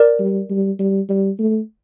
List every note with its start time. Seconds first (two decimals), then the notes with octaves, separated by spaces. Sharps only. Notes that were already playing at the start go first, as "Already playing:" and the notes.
Already playing: A#4 D5
0.20 G3
0.50 G3
0.80 G3
1.09 G3
1.39 A3